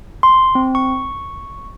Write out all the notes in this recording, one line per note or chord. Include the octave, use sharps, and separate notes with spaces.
C6
C4
C#6